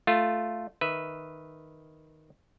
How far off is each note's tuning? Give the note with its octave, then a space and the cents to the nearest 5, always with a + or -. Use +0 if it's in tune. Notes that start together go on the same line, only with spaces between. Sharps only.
A3 +0 F4 +0
D#3 +0 B4 +0 E5 +0